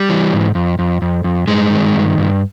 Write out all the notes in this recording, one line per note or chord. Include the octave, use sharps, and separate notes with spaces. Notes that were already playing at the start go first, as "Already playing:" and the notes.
Already playing: G3
E3
G#2
F2
F2
F2
F2
G2 G#3
D#3
G2
G2